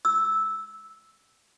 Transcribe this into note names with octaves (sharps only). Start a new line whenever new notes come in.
E6